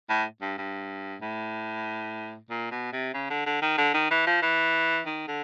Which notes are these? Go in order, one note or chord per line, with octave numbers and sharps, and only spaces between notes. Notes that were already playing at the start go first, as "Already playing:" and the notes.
A2
G2
G2
A2
A#2
B2
C3
C#3
D3
D3
D#3
D3
D#3
E3
F3
E3
D#3
D3